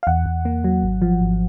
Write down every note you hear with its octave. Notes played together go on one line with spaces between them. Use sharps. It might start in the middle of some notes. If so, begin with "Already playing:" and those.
F5
E2 F#5
E2
A#3
F#3
G#1
F3
G#1